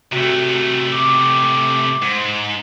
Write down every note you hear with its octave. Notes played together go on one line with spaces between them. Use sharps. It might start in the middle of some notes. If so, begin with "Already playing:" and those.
C3 A3 F#4
D6
G#2